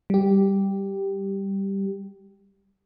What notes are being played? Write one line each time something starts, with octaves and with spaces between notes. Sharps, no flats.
G3 G4